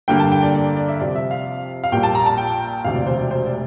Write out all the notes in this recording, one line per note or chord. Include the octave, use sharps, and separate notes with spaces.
G2 D3 G3 A#3 G5
A5
G5
D5
D5
D5
E5
F2 C3 G3 C4 D5
E5
F5
F5
A#1 A#2 G3 A#3 G5
A5
A#5
A5
G5
E1 D2 C3 E3 F5
D5
C5
D5
C5
D5